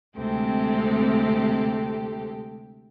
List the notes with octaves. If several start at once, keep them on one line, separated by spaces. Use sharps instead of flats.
D2 C3 G#3 C4 G4 A4